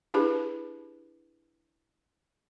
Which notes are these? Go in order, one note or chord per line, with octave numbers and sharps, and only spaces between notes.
D4 E4 G4 G#4 B4